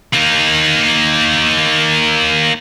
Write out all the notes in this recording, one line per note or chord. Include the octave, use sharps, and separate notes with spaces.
A#3 D#4